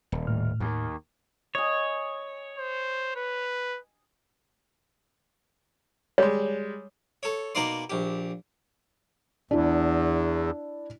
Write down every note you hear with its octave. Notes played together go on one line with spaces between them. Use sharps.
D#1
A2 F6
D#2
C#5 D#5 G#5
C5
B4
G3 G#3 C#5
A4 C#5
B2 A#3 D#4 D5 C6
A#1 G4
E2 D4 E4